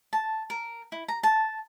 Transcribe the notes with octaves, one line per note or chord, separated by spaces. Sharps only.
A5
A#4
E4
A#5
A5